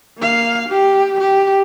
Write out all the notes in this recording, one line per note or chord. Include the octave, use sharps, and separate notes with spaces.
A#3 F5
G4
G4